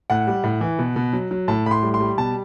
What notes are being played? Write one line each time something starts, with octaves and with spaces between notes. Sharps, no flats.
A2 F#5
G3
A2
E3
B2
B2
F#3
F#3
A2 A5
A2 B5 C6
G3
C6
G3
B2 A5